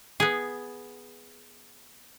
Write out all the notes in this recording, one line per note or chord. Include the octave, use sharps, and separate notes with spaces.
B3 G#4